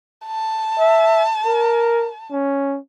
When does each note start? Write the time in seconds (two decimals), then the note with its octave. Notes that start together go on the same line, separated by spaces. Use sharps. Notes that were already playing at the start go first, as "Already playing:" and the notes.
0.26 A5
0.78 E5
1.46 A#4
2.31 C#4